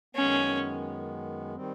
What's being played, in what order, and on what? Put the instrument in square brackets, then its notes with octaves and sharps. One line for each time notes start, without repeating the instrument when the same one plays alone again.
[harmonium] F#2 D#3 G#3 B3 [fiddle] C#4
[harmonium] D#3 G3 C4